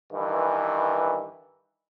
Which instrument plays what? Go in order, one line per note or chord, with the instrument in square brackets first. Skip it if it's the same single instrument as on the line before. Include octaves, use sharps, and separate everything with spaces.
[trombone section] G2 D#3 E3